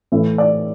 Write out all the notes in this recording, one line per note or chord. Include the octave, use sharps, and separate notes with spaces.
A2 E3 E5
D5